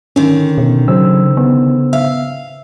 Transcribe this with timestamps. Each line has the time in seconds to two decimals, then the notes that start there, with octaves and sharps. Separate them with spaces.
0.16 D3 D#3 C#4
0.58 B2
0.88 C#3 F#3 C5 E6
1.37 B3
1.93 E5 F5